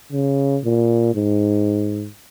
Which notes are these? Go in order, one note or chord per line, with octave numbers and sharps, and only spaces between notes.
C#3
A#2
G#2